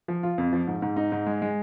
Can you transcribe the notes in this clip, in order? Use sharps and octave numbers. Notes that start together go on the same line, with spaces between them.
F3
F4
F2
F3
G#2
G#2
D#4
G#2
G#3
G#3